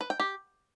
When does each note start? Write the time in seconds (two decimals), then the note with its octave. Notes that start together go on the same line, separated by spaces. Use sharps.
0.01 B4
0.10 G5
0.20 G4